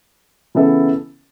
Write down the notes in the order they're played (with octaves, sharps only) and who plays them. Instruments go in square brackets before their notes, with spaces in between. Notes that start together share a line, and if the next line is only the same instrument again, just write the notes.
[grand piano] C#3 E3 B3 E4 A4